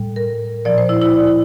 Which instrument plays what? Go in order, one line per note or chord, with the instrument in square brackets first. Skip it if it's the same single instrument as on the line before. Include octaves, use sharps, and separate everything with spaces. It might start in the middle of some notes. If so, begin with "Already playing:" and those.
Already playing: [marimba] A2 G3
A#4
A#2 F3 D5
C5
E4
E4
D5